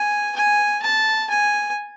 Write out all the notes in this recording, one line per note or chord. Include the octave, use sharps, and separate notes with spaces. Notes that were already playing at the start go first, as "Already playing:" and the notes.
Already playing: G#5
G#5
A5
G#5